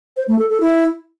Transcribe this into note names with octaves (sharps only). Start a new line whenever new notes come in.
C5
A3
A4
A4
E4